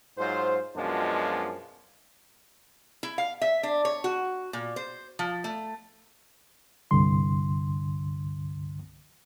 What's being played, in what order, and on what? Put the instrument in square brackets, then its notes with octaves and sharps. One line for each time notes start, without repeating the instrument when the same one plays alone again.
[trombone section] G#2 F#3 F4 C5
F#2 B2 F3 G#3 D4 F4
[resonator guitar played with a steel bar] E4
F5
E5
D4
C#5
F#4
A#2
C5
F3
A3
[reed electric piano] C2 G2 D3 C6